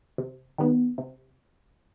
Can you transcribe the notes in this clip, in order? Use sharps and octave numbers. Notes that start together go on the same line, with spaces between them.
C3
D#3 G3 B3
C3